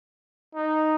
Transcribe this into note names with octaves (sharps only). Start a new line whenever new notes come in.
D#4